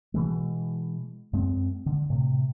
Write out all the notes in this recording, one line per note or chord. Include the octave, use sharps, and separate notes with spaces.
B2 E3 G#3
F#2 G#3 C4
D3
A2 C3